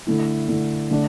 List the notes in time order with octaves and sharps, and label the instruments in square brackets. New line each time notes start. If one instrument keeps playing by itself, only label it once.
[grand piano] D3 A3 E4
D3 A3 E4
D3 A3 D4